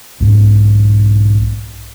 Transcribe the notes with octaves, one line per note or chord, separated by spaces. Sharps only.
B1 G#2 C#4